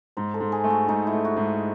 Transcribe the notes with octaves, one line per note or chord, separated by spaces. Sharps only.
G#2 C5
A4
G#2
G#4
A3
F#4
G#2 D#4
E4
A3
F#4
G#2